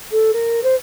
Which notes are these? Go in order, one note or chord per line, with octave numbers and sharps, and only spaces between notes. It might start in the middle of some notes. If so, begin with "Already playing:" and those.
A4
A#4
C5